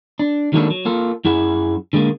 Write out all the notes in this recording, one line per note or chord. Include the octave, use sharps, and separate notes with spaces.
D4
D#3 F#3 G#3 A#3 D4 A4
F#3
A#3 F4 A4
F#2 E4 G#4 F#5
D3 G3 G#3 A#3